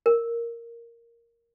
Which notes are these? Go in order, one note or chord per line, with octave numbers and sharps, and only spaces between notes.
A#4